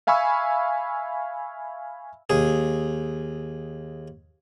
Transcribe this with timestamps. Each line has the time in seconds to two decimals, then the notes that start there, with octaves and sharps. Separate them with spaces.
0.07 E5 F5 G#5 B5 C#6 E6
2.30 D#2 G#4